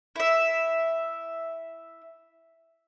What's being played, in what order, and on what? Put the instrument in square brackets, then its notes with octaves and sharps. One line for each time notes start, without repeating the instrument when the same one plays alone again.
[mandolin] E4 E5